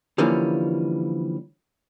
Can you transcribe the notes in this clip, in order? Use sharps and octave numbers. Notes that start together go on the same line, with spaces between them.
D3 E3 F3 G3 A#3 C#4